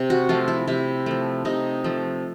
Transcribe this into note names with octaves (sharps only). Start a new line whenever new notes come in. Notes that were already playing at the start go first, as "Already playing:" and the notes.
Already playing: C3
F#4
F3 A3 F4
E4
C3 E4
F3 A3
C3 D#4
F3 A3